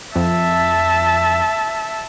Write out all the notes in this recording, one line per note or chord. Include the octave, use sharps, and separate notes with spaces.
F2 E5 A5